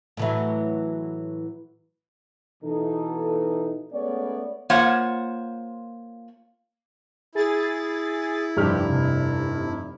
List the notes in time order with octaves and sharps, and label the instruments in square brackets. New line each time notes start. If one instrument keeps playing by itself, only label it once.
[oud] A2 E3 F#3
[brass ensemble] B2 E3 D#4 A4
G#3 A3 B3 C#4 C#5 D5
[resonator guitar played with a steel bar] A#3 F4 C5 C#5 F#5
[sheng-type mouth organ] E4 [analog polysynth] G#4 A6
[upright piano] F1 G2 F6 [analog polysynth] F3 G4
[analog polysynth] C3